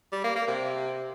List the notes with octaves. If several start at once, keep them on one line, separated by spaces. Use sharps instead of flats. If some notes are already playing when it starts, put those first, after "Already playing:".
G3
A#3
A#3
C3